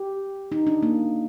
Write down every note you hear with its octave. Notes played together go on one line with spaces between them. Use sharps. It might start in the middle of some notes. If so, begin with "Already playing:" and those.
Already playing: G4
D#4
D4
A#3